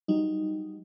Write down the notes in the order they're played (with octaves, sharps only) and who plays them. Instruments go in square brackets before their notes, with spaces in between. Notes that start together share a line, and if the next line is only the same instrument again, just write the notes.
[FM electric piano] F#3 G3 D#4